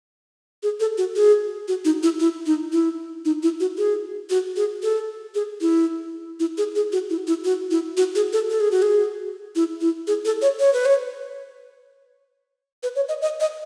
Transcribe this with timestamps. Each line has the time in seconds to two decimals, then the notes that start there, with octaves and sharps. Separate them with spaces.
0.63 G#4
0.80 A4
0.98 F#4
1.16 G#4
1.68 F#4
1.85 D#4
2.03 E4
2.20 E4
2.46 D#4
2.73 E4
3.25 D#4
3.43 E4
3.60 F#4
3.78 G#4
4.30 F#4
4.57 G#4
4.83 A4
5.35 G#4
5.61 E4
6.40 E4
6.58 G#4
6.76 G#4
6.92 F#4
7.10 E4
7.27 E4
7.45 F#4
7.71 E4
7.97 F#4
8.15 G#4
8.33 A4
8.50 A4
8.60 G#4
8.71 F#4
8.82 G#4
9.56 E4
9.81 E4
10.07 G#4
10.25 A4
10.42 C#5
10.60 C#5
10.73 B4
10.86 C#5
12.83 B4
12.96 C#5
13.09 D#5
13.22 D#5
13.40 D#5